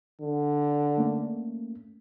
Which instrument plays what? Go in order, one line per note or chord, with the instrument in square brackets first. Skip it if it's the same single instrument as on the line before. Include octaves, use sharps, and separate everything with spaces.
[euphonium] D3
[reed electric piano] A3 A#3 C#4